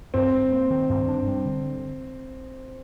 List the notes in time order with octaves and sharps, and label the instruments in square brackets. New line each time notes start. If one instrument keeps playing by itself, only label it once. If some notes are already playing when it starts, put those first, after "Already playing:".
[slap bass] G2 [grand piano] C4
[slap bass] G2
A#3
D#3
G2
D4
G3
D3